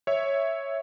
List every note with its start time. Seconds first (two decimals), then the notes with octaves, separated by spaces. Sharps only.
0.07 C#5 E5